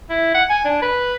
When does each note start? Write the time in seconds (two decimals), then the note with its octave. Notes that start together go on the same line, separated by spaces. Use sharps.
0.10 E4
0.34 F#5
0.50 G#5
0.65 D4
0.82 B4